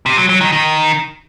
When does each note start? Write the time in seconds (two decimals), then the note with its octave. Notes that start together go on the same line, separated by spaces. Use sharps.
0.06 C3
0.17 F#3
0.29 F#3
0.41 D#3
0.52 D#3